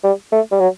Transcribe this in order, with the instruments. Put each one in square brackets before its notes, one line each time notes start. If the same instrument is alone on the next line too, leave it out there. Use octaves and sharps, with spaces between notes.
[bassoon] G3
A3
G3
F#3